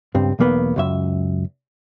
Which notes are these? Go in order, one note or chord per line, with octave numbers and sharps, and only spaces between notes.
C#2 G2 C4
B1 E2 A#3 B3
C#2 F#2 E5